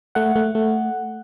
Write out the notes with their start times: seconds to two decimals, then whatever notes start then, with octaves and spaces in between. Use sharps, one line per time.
0.15 A3 F#5
0.36 A3
0.55 A3